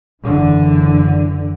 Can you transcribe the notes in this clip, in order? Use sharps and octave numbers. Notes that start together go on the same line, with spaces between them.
F#1 D3 E3